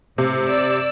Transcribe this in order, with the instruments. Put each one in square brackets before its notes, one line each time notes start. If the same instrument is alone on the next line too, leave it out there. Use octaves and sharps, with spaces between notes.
[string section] A2 [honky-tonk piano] C3
[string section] D5 E6